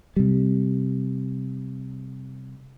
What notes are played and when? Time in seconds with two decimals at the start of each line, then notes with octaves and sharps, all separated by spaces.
0.16 C3 G3